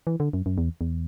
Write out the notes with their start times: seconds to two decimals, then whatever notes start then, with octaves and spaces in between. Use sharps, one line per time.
0.07 E3
0.20 D3
0.33 F#2
0.46 F#2
0.58 E2
0.81 E2